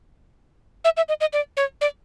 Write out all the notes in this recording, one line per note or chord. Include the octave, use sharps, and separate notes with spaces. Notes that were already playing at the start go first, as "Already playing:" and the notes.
E5
E5
D#5
D#5
D5
C#5
D5